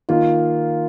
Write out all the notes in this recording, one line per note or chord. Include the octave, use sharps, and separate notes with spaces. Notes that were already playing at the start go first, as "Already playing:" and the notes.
D#3 A#3 D#4 F4